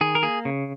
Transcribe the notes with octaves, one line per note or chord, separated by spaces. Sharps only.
D#3 G#4
A#4
A#3 G#4
C#3